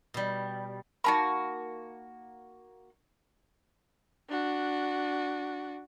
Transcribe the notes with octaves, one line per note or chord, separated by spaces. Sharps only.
B2 G3
A#3 D#4 E4 F#4 A5 B5
D4 F#4